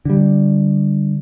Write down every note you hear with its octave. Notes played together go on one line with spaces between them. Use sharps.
D3 G3